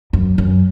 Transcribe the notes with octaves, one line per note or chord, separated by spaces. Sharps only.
F#2
F#2